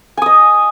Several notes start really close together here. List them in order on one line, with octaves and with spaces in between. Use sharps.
G#5 D#6 D#5